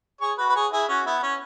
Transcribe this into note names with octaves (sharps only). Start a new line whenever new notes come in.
G#4 C#5
F#4 B4
B4
G#4 C#5
E4 G#4
C#4 F#4
B3 E4
C#4